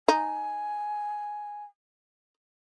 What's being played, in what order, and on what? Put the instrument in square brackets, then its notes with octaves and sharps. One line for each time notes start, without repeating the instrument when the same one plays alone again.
[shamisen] D#4 [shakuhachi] G#5